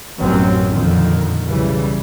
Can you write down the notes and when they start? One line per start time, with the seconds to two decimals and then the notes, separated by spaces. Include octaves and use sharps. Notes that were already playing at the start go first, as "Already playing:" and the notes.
0.18 A1 F#2 B2 F#3 C4 C#4
0.68 F2 A#2 D3 D#3
1.46 B1 C#3 E3 G3